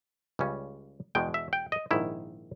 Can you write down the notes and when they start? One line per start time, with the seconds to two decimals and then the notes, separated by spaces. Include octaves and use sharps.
0.39 C#2 C#3 G3 C#4
1.15 E2 B2 G#3 G5
1.34 E5
1.53 G5
1.72 D#5
1.91 A#1 G#2 D#3 E4